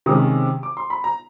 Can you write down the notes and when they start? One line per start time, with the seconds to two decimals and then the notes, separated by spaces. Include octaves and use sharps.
0.06 C3 D#3 G#3 C#4 D#6
0.63 D6
0.77 C6
0.90 B5
1.04 A#5